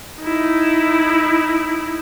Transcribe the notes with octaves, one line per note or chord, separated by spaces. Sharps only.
D#4 E4